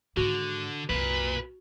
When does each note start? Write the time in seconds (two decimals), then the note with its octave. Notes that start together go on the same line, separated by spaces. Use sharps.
0.17 G#2 D3 D#3 F#4
0.89 C2 F#2 A#2 B4